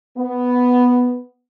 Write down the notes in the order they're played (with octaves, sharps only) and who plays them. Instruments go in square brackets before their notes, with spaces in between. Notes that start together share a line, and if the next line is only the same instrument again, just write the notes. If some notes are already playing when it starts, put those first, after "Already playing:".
[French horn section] B3